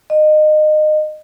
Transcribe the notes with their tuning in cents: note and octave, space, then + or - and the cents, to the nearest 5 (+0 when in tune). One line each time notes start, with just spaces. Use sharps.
D#5 -25